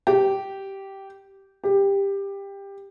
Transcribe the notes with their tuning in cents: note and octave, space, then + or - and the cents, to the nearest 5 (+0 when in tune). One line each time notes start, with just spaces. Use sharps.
G4 -10
G4 +15